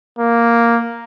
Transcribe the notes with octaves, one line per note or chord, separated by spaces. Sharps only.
A#3